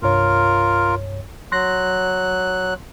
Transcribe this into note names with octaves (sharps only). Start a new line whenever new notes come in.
C2 G2 F4 A#4 C#5
F#3 C6 F#6 A#6